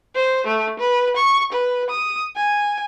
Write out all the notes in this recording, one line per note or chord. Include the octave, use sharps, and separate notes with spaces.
C5
A3
B4
C#6
B4
D#6
G#5